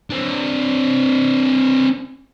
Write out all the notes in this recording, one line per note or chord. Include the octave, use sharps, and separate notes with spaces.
C4 D4